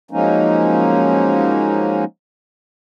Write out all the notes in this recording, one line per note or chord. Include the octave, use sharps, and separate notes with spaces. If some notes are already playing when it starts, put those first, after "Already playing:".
F3 F#3 G#3 A#3 C#4 D#4